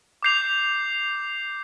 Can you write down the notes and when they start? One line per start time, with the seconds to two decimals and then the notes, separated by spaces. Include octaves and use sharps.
0.23 D6 G6 C7 F7